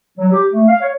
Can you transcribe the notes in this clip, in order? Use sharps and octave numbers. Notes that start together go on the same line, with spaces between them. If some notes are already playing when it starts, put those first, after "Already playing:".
F#3
G4
A3
F5
C#5